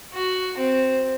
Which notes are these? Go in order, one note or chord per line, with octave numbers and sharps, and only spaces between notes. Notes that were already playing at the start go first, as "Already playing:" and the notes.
F#4
C4